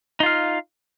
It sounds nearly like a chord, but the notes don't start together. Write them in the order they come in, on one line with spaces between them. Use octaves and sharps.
D#4 F4 F5